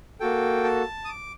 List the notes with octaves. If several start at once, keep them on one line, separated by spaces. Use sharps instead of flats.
A#3 F#4 A4 G5
A5
D#6
D6